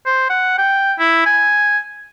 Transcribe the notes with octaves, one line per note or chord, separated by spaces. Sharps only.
C5
F#5
G5
E4
G#5